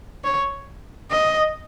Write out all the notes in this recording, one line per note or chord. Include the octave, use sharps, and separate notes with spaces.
C#5
D#5